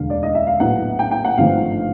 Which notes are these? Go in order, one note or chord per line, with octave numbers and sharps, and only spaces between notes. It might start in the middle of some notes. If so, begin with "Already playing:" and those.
Already playing: E1 D2 D3 F5
D5
D#5
E5
F5
A#1 A2 F#3 B3 F#5
G5
G5
F#5
G#1 G2 D3 F3 A3 F5